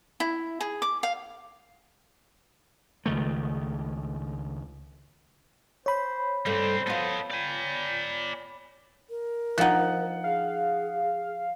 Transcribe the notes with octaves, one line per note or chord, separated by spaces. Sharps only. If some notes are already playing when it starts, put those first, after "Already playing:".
E4
G#4
D6
F5
C#2 D#3 A3
C5 C#5 B5
G2 G3 A3 C4 C5
B3 F4 A4 D#5
D5 G5 G#5
A#4
F3 D#4 F#5 F#6
G#4 F5